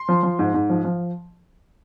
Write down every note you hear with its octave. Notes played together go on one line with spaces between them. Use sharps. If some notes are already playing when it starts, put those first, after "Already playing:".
Already playing: C6
F3
F3
G#2
G#2
F3
F3